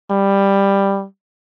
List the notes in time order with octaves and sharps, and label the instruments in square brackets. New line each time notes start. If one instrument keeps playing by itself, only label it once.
[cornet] G3